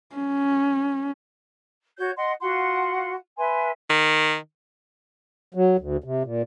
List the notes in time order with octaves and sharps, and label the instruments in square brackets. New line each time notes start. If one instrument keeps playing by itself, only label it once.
[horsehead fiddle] C#4
[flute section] F#4 C#5 G6
D#5 F#5 C6
F4 F#4 F#5 C6
B4 E5 G#5 C6
[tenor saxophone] D#3
[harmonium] F#3
D2
C3
A#2